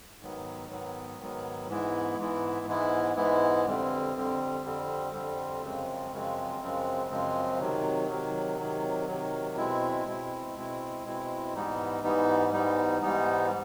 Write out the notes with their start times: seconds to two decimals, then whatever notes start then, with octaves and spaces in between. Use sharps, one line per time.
0.21 G#2 D#3 F#3 B3
0.70 G#2 D#3 F#3 B3
1.20 G#2 D#3 F#3 B3
1.69 G#2 E3 G#3 B3 E4
2.17 G#2 E3 G#3 B3 E4
2.67 G#2 E3 G#3 B3 E4
3.16 G#2 E3 G#3 B3 E4
3.65 F2 D3 G3 C4
4.15 F2 D3 G3 C4
4.64 F2 D3 G3 C4
5.13 F2 D3 G3 C4
5.62 F#2 C#3 F3 G#3 C4
6.12 F#2 C#3 F3 G#3 C4
6.61 F#2 C#3 F3 G#3 C4
7.10 F#2 C#3 F3 G#3 C4
7.60 C3 D#3 F#3
8.09 C3 D#3 F#3
8.58 C3 D#3 F#3
9.07 C3 D#3 F#3
9.57 B2 G#3 C4 E4
10.06 B2 G#3 C4 E4
10.55 B2 G#3 C4 E4
11.04 B2 G#3 C4 E4
11.54 G#2 E3 G3 B3 D#4
12.03 G#2 E3 G3 B3 D#4
12.52 G#2 E3 G3 B3 D#4
13.02 G#2 E3 G3 B3 D#4